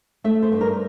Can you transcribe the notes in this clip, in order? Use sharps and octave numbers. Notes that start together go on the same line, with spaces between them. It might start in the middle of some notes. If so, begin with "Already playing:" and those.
A3 E5
C5
G2
A#4